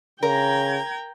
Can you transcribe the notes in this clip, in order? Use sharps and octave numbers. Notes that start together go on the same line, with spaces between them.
C#3 A#4 G5 A#5 G#6